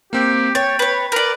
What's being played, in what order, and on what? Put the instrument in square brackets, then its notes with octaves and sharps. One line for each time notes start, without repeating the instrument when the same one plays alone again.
[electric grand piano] A#3 C4 [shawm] G4
[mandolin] C#5 [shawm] G5 [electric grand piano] A6
[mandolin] B4 C#5
[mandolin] A#4 D5 [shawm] B4